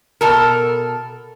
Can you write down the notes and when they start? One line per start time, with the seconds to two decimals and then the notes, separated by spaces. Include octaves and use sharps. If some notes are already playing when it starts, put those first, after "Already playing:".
0.21 B2 A4 A#4